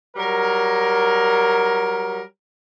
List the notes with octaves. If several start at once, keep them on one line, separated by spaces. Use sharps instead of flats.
F#3 G3 A#4